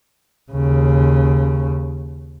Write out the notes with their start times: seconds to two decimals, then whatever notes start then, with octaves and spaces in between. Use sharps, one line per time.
0.52 D#2 C#3